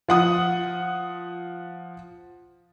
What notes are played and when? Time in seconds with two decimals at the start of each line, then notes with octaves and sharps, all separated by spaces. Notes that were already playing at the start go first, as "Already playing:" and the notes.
0.08 F3 F#5 D#6